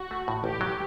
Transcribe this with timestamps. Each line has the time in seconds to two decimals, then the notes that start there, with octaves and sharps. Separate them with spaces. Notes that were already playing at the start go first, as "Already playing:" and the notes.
Already playing: F#4
0.11 A3
0.28 A2
0.44 A1 G4
0.61 F#3